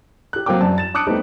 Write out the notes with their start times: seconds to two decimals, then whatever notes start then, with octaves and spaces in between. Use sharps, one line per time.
0.33 G4 F#6
0.46 F#3 A#3 C4 G5 D6
0.61 F#2 D5 A5
0.78 A6 E7
0.94 A5 D6 D#6 F#6 C#7 D7
1.07 G3 A3 B3 C4 D#4 G4